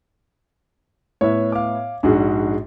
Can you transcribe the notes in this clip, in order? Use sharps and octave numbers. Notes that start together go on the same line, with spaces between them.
A2 B3 E4 C#5 E5
F5 D6
A#1 G#2 D4 F#4 G#4